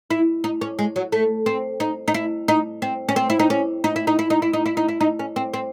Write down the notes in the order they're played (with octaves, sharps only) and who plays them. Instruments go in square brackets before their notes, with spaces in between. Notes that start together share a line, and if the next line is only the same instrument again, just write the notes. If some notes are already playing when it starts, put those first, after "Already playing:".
[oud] E4
D#4
C#4
G#3
F#3
A3
C4
D#4
D#4
E4
D#4
C4
C#4
C4
E4
D#4
C#4
D#4
E4
D#4
E4
D#4
E4
D#4
E4
D#4
E4
D#4
C#4
C4
C4